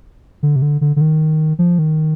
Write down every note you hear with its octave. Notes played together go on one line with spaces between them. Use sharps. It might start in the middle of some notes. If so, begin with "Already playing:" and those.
D3
C3
D3
D3
D3
D#3
F3
D#3